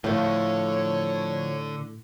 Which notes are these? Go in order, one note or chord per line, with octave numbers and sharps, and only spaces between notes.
A2 D3 F3 A3 C#5